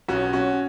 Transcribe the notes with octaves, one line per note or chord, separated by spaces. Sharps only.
B1 B2 C#4 F#4
C#4 F#4